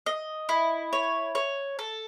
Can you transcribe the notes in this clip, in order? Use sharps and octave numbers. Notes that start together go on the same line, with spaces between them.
D#5
E4
C#5
C#5
A4